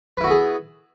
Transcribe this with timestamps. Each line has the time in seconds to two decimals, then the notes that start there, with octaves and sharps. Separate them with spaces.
0.17 B4
0.21 E4
0.24 F#4
0.27 B3
0.30 G#4